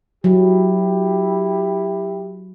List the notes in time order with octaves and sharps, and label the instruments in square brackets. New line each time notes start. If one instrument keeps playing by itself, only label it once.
[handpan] F#3 [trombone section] E4 G4